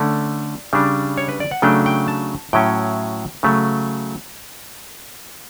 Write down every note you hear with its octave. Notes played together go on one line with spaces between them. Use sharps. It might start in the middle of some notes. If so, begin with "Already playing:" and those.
Already playing: D3 A3 C#4 D5
C#3 G3 D4
C#5
B4
D5
F#5
C#3 F#3 A3 D4 G5
G5
A5
A2 F#3 C#4 G5
C#3 F#3 A3